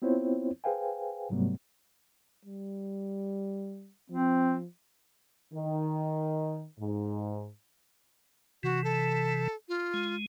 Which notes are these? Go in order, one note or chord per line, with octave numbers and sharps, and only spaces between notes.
B3 C4 E4 F4 C5 C#5
G#4 B4 C5 F5 G5 G#5
G#2 C3 F#3 G3 A3 B3
G3
F3 C4
D#3
G#2
C3 E3 F#4
A4
F4
G#3